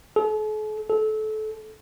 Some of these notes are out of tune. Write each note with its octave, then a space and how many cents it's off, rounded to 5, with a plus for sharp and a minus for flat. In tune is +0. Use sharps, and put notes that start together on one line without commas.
A4 -45
A4 -25